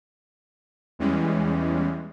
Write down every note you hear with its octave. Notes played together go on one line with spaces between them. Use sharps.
E2 E3 G3 G#3 C#4